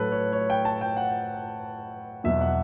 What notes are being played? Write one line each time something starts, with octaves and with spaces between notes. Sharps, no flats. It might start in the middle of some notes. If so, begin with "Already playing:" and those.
Already playing: A2 F#3 A4 B4 C#5
C#5
C#5
G5
A5
G5
F#5
E2 B2 F#3 E5
F#5